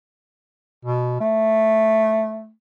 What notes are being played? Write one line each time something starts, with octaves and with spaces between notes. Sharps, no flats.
B2
A3